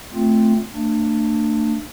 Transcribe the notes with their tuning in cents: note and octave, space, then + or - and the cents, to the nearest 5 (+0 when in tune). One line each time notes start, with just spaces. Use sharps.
A3 +0 C4 +0 F4 +0
A3 +45 D4 +20